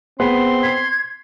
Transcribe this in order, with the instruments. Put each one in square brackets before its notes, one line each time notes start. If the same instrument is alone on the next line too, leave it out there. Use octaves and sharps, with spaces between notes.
[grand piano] B3 G#4 B4 [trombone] C4 [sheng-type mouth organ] C6
[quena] G#6 [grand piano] B6 C7